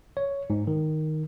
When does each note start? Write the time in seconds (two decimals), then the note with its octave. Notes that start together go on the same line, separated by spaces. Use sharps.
0.17 C#5
0.50 G#2
0.67 D#3